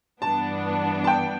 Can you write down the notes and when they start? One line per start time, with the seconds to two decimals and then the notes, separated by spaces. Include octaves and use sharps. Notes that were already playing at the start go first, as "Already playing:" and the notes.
0.22 G2 E3 B3 D4 A5
1.04 A5
1.07 G5